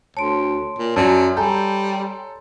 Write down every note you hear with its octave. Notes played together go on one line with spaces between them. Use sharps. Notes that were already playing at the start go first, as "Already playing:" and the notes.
D2 C#5 A5 C6 D7
A#2
F#2 F#3 D5 A5
G3 A4 G#5 A#5 G6